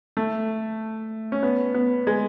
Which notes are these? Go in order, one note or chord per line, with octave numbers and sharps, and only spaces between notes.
A3
C#4
B3
B3
G#3